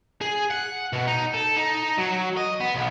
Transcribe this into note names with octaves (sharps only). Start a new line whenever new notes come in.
G#4
F#5
B2
D#4
A4
D#4
F#3
D#5
B3
B1